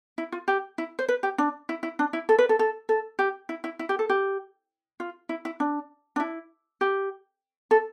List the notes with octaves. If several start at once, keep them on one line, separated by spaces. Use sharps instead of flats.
E4
F4
G4
E4
C5
B4
G4
D4
E4
E4
D4
E4
A4
B4
A4
A4
A4
G4
E4
E4
E4
G4
A4
G4
F4
E4
E4
D4
D4
E4
G4
A4